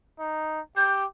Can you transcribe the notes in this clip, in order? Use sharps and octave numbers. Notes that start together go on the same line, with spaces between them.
D#4
G4 G6